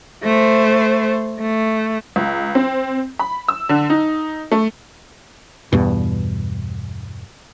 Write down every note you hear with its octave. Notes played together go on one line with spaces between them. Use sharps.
A3 C5
A3
C#2
C4
B5
E6
D3
D#4
A3
E2 G2 B2